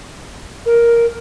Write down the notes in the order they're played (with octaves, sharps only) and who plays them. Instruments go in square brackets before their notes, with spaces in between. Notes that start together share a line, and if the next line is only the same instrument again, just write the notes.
[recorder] A#4